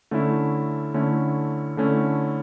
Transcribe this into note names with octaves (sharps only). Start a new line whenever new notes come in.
D3 A3 C#4 E4
D3 A3 C#4 E4
D3 A3 C#4 E4